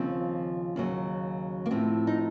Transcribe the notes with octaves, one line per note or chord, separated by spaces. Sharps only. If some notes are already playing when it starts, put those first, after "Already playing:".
Already playing: D#2 C#3 F3 C4
D#2 C#3 F#3
A#3
A2 F3 C4
D#4